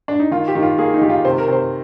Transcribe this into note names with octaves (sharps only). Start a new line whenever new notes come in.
D4
D#4
D#3 F4
G4
D#3
F4
A#3 G#4
D#4
D#3 G4
F4
C3 C5
A#4
C3 C5